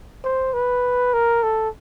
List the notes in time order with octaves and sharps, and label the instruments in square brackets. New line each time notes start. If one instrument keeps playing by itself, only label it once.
[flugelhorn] C5
B4
A#4
A4